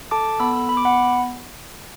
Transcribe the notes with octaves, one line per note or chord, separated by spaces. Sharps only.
A4 A5 D6
B3 B5 E6
B3 B5
D6
F#5 B5